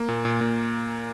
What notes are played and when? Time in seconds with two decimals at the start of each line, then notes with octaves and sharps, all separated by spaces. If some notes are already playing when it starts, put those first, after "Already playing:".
Already playing: A#3
0.08 A#2
0.25 A#2
0.41 A#2